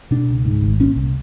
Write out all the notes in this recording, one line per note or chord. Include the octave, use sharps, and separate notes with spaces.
B2 D4
C#2
G#2
G#1
A#2 C#4
C2